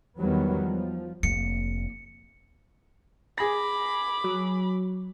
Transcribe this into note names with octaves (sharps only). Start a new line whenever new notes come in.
E2 D#3 E3 F#3 G3 B3
F3
F1 A#3 C#7
G#4 B5 D6 A#6
F#3